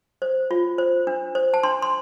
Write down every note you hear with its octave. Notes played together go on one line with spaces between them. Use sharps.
C5
F4
C5
D4
C5
A5
D4 C6
C6